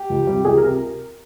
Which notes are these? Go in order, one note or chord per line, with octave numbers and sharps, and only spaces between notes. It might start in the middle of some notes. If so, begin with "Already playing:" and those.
Already playing: G4
C#2
C3 G3
C#2 G#4
A#4
C3